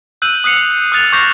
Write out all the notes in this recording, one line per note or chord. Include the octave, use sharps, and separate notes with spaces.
E6 F#6 G6 D#7 F#7
D#6 F#6 C7 C#7 F7
D#6 F6 F#6 A6 F7
C#6 D6 G6 A#6 C7 F7